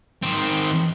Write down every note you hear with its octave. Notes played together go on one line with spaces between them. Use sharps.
D#3 C4